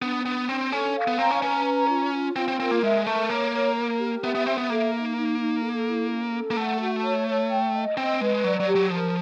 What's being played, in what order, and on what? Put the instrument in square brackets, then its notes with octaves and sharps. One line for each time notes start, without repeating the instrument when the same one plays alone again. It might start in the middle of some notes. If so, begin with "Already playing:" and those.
[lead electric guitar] B3 [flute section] D4
[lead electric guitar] B3 [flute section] D4
[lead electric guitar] C4 [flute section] D4
[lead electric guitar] C#4 [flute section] A4
[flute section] F5
[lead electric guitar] B3
[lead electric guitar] C4 [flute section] A#5
[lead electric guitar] C#4
[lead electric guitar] C#4 [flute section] B4
[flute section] A#5
F4
F4
[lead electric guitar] C4 [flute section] F4
[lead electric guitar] C4
[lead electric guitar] C4 [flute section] A#4
[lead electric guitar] A#3
[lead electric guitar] G#3 [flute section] E5
[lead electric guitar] A3 [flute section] A#4
[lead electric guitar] A#3 [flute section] C#5
[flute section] A#4
A#4
G4
[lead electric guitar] B3 [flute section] E5
[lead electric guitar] B3
[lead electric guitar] C4 [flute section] E5
[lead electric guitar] B3
[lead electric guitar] A#3 [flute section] A4
[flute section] D#4
D#4
D#4
A4
E4
C#4
A4
[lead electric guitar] A#3
[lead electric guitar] A3 [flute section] F#5
[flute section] F#4
C#5
C#5
G5
D#5
[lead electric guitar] C4 [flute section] D#5
[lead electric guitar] G#3 [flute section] B4
[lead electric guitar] F#3 [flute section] D5
[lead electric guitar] F#3
[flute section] G4
[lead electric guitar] F#3
[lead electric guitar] F3 [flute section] A#4